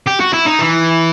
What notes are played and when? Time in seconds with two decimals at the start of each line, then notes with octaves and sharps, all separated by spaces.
0.07 G4
0.20 F#4
0.33 E4
0.46 D#4
0.60 E3